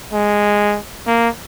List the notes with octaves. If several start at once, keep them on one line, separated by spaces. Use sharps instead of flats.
G#3
A#3